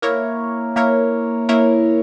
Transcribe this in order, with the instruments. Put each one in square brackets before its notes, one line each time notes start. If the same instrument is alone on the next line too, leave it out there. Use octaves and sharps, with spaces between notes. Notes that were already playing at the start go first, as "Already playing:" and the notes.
[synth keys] A#3 E4 A#4 C#5
A#3 E4 A#4 C#5
A#3 E4 A#4 C#5